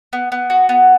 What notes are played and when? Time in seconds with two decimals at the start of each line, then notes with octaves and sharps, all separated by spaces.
0.13 B3
0.32 B3
0.50 F#4
0.69 B3